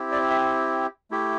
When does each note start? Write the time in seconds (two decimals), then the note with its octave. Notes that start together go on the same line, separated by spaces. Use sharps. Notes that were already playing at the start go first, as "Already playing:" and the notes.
Already playing: C4 E4 G4
0.12 D5
0.30 E5
1.11 A3 E4 G4